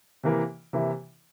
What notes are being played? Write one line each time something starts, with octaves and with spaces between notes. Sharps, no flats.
C3 E3 A#3 E4
C3 E3 A#3 E4